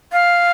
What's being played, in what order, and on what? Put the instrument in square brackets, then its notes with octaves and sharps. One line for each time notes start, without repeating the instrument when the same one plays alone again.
[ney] F5